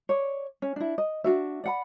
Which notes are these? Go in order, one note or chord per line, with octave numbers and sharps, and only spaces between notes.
C#5 D5
C#4
D4 E4
D#5
D4 F4 F#4 E5
D5 F#5 B5